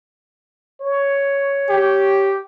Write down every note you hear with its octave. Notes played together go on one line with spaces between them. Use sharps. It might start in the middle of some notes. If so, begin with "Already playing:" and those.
C#5
G4